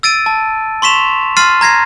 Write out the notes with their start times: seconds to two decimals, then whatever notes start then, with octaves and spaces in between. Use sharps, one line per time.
0.03 E6 A6 D7 D#7
0.26 A5
0.82 C6 C#6 B6 E7 F7
1.37 C6 F6 A6 C7 D#7
1.61 A#5 G#6 A#6 C7